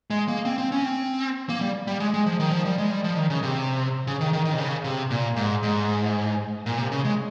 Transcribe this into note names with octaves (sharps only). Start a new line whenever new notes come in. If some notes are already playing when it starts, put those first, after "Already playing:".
G#3
A#3
C4
C4
C#4
C4
A#3
G3
G3
G#3
G#3
F3
D#3
F3
G3
G#3
G3
F3
D#3
C#3
C3
C#3
D#3
D#3
D#3
C3
C#3
C3
A#2
G#2
G#2
A#2
C3
C#3
G#3